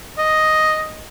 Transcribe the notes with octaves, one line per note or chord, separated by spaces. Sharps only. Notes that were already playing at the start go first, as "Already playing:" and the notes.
D#5